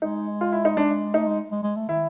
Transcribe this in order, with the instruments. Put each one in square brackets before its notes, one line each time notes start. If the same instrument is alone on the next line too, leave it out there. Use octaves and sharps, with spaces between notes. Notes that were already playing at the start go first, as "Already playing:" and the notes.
[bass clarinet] G#3 [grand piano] D#4
[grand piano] F4
E4
D#4
[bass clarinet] G#3 [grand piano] D4
[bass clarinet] A3 [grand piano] D#4
[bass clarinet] G#3
G#3
G#3
A3
[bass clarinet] D#3 [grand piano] E4